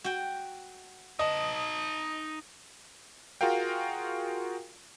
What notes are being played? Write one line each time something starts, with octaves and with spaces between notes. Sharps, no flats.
F#4 G5
D#4 D#5 A5
F4 F#4 G#4 A#4 F5 G5